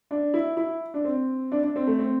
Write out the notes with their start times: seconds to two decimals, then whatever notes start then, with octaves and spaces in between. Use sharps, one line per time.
0.11 D4
0.34 E4
0.57 E4
0.94 D4
1.04 C4
1.52 D4
1.63 D4
1.76 C4
1.87 A3
1.99 C4